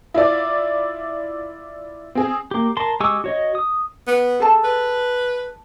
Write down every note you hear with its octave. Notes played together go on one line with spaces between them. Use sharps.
E4 F4 D5
C4 G#4
A#3 G4
A#4 A5 C6
G#3 G4 G#5 C#6 E6
F#4 C#5 D#5
D#6
B3
G#4 A4 A5
B4